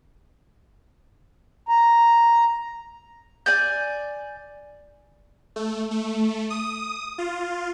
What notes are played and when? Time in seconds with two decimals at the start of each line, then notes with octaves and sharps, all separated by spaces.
1.69 A#5
3.46 D5 G#5 G6
5.56 A3
5.91 A3
6.50 D#6
7.18 F4